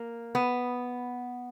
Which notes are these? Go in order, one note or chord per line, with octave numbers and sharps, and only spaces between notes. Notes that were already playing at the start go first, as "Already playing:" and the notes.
Already playing: A#3
B3